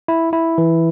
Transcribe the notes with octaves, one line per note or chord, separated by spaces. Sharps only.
E4
E4
E3